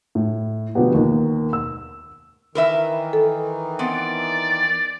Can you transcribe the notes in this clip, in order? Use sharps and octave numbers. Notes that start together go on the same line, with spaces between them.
A2
B2 D3 F3 F#3 B3 G4
D#2 B2 D#3
E6
D#3 E3 A#4 B4 E5
A4
B3 C4 D5